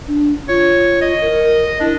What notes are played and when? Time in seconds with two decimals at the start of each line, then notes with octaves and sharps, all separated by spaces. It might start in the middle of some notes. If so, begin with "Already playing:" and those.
0.08 D4
0.49 F4 C#5
1.02 D#5
1.21 A#4
1.80 D4 E4